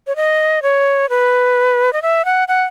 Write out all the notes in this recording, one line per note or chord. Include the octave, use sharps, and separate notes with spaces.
C#5
D#5
C#5
B4
D#5
E5
F#5
F#5